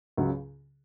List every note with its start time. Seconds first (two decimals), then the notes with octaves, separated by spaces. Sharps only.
0.17 C#2 C#3 F#3